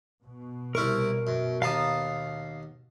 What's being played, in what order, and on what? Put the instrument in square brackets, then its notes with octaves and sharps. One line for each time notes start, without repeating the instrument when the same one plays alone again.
[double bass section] B2
[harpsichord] C2 E4 C#6 [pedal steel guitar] A#4 F6
[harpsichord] F#2
[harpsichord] D#2 B3 A5 [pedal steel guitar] F5 A#5 D#6